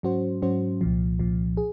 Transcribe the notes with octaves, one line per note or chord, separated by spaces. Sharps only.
G#2 F#3 C#4 F#4 C5
G#2 F#3 C#4 F#4 C5
C2 A#2 F3
C2 A#2 F3
G#4